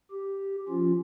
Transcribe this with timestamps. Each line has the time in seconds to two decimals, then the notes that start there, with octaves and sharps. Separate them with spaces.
0.11 G4
0.69 F3 C#4 F4